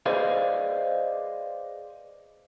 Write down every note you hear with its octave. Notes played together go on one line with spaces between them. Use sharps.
G#4 B4 C5 D5 D#5 F5